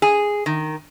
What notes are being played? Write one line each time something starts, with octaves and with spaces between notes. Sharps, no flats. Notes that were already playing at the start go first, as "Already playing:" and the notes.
G#4
D#3